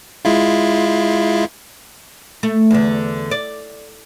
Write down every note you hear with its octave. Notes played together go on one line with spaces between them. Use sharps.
G#3 E4 F4
A3
E2 D3
D5